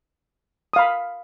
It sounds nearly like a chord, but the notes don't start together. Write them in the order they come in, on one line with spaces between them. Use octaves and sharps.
D#6 F5 B5